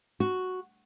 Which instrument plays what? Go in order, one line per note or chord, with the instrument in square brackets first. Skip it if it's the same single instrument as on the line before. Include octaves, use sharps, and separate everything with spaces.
[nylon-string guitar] F#4